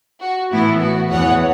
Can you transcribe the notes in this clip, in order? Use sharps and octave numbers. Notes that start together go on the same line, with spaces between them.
F#4
A2 E3 B3 E4
F#4
E2 E3 B3 C#5 F#5